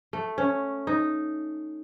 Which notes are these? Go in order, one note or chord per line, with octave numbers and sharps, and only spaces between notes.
A3
C#4
D#4